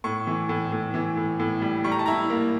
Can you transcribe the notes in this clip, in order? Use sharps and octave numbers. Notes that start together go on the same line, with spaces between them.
A2 C#6
E3
A2
A2
E3
A2
A2
G3
G3 C#6
A#5
A5
E4 A#5
A#3